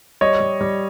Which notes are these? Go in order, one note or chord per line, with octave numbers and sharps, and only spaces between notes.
G3 C#5 D#5
G3
G3